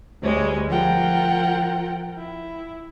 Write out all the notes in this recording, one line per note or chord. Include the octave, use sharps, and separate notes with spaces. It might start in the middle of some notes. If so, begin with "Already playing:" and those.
D2 G3 G#3 C#5
F3 F4 A#4 F#5 G5
E4